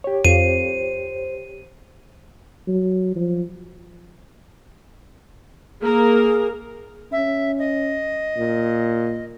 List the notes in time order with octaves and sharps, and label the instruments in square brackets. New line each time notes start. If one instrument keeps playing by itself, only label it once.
[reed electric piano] G4 C#5
[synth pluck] F2 [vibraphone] C5 [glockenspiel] D#7
[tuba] F#3
F3
[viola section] A#3 A#4 [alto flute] G#4
[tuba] C#4 [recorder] E5
[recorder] D#5
[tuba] A#2